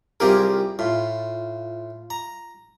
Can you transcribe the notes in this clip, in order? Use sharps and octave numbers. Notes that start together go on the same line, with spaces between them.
C2 C4 F4 G4 G#4 A#4
A2 F4
A#5